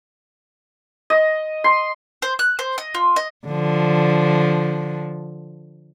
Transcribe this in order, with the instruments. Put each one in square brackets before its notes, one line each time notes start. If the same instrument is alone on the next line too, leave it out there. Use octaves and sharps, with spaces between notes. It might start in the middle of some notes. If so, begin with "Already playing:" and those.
[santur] D#5
C6
[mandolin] C5
F#6
C5
D#5
F4
D#5
[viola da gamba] D3 F3